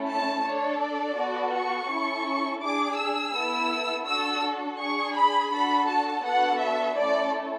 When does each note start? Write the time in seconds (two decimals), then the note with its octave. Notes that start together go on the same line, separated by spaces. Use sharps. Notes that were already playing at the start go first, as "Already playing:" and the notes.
Already playing: A3 C#4 E4 A4
0.10 A5
0.46 D4 A4 C#5
0.82 D5
1.18 B3 F#4 A4
1.54 C#6
1.90 C#4 E4 A4
2.63 D4 G#4 D6
2.99 E6
3.35 B3 E4 A4
4.07 D4 F#4 A4 E6
4.79 D4 G#4 C#6
5.15 B5
5.51 D4 F#4 A4 B5
5.87 A5
6.24 B3 D4 F#4 A4 F#5
6.60 E5
6.96 A3 C#4 E4 A4 D5